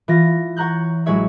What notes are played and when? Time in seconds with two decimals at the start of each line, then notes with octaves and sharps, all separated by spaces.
0.08 E3 F4 A#6
0.57 C#5 F#5 A#5 F#6 G6
1.06 A1 F#3 G#3 E4 C#5 E5